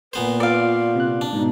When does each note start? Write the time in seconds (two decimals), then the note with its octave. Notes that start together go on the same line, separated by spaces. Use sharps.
0.13 A#2 B3 B4 C5
0.40 F4 D5 F5
0.95 C3 F#6
1.21 D4
1.33 G#2 B2 D#4